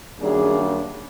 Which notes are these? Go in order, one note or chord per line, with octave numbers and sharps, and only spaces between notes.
F#2 D#3 G3 A#3 D4 G#4